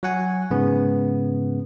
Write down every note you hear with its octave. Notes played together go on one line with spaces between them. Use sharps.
F#3 F#4 F#5 G#5
G#2 C#3 B3